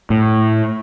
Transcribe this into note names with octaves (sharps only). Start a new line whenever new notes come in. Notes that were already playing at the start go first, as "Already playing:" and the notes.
A2